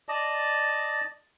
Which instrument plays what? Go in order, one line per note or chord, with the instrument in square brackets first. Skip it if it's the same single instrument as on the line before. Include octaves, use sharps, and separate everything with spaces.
[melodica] D5 D#5 A5